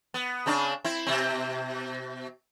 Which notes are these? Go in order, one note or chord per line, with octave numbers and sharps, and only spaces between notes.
B3
C#3 C4 D4
C4 E4
B2 C4